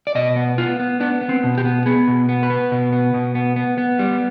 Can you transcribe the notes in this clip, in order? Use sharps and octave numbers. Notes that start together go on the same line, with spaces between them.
D5
B2 D#5
B3
B3 F4
B3
B3 D4
B3
C4
B2
G4
B3
B3 G#4
B2
B3
B4
B3
B2
B3
B2
B3
B3
B3
G3